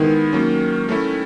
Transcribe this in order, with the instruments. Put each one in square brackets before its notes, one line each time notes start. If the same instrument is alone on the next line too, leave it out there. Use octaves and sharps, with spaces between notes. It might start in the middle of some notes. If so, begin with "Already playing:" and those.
Already playing: [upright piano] D#3 [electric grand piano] G#3 B3 E4
[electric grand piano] F#3 A#3 C#4
A3 C#4 E4